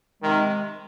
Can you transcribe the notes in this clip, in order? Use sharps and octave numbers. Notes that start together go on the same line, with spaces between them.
C3 D#3 G#3